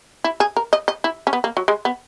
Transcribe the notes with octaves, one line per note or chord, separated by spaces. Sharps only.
E4
G#4
A#4
D#5
D#5
E4
C#4
B3
A#3
F#3
G#3
B3